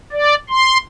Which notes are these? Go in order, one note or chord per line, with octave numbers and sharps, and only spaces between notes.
D5
C6